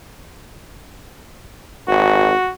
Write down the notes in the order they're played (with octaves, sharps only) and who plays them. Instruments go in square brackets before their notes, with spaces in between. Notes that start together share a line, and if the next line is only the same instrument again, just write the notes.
[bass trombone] G#1 [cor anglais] F#4